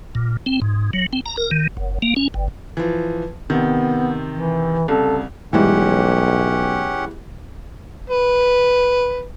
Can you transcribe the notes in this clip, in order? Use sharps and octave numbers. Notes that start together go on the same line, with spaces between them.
A#2
C4
G#2
F#3
C4
A#5
A#4
D#3
F#1
A#3
C#4
G1
E3 F3
C3 D#3 B3
E3
C2 C#3 A4
B1 E3 G3 G#3 C#4 G4 F#5
B4